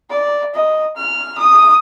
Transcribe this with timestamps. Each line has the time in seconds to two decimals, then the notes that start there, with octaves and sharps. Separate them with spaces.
0.10 D5
0.54 D#5
0.97 F6
1.38 D#6